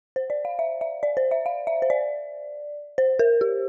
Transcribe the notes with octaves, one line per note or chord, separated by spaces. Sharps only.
C5
D5
F5
E5
E5
D5
C5
E5
F5
E5
C5
D5
C5
A#4
G4